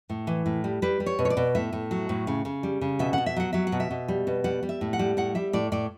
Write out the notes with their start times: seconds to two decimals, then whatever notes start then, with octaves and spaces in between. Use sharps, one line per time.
0.09 A2
0.27 E3
0.46 A2
0.64 G3
0.82 G3 B4
1.00 G3
1.06 C#5
1.19 B2
1.25 C#5
1.30 D5
1.37 B2
1.55 A2 E5
1.73 A2
1.91 F#3
2.09 A2
2.27 C#3
2.45 C#3
2.63 G3
2.81 C#3
2.99 B2 E5
3.13 B2 F#5
3.26 E5
3.36 F#3 F#5
3.53 F#3 E5
3.67 F#5
3.72 B2
3.80 E5
3.91 B2
4.08 G3
4.27 B2
4.44 G3 F#5
4.63 G3
4.69 E5
4.81 A2
4.93 F#5
4.99 G3
5.17 A2 F#5
5.35 G3 E5
5.53 A2 D5
5.72 A2 D5